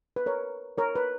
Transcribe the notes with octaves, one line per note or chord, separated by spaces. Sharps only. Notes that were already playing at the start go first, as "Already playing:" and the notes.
B4
A#4 C#5
A#4 C#5
B4